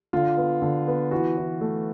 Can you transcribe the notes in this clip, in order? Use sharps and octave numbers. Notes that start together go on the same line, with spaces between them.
D3 F4
B3
D3
B3
E3 F#4
E3
A3